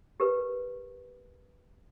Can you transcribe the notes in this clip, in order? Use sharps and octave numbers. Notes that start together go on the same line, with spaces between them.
G4 A#4 B4